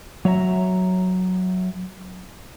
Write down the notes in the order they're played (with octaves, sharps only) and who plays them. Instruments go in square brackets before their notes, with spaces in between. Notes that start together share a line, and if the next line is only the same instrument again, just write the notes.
[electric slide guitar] F#3 C#5 E5 A#5